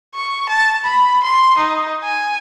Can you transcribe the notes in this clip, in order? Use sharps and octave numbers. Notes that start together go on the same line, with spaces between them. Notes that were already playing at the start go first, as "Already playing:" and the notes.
C#6
A5
B5
C6
D#4
G#5